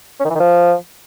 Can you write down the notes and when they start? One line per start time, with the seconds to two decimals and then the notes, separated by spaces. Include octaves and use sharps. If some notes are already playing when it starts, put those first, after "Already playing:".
0.20 C#4
0.25 D#3
0.30 E3
0.35 D#3
0.40 F3